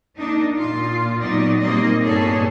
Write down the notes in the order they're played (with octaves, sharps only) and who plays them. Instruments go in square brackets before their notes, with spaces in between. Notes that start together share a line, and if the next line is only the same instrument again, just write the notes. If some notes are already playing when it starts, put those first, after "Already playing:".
[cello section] A#3 D4 D#4
A#2 F4
A#2 F#3 B3 D#4 D5
A#2 G3 A#3 C4 D#4 D#5
G2 A#2 B3 G#4 A4 C#5